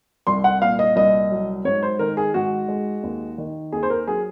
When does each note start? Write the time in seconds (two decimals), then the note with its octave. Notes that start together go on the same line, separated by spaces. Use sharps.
0.27 C2 C6
0.44 F#5
0.61 A#2 F5
0.79 D#5
0.96 C2 D#5
1.31 F#3
1.65 G#2 C#5
1.83 C5
1.99 D#3 A#4
2.17 G#4
2.34 G#2 F#4
2.68 G#3
3.03 D#2
3.38 D#3
3.72 D#2 G#4
3.83 C5
3.90 A#4
4.07 F#3 G#4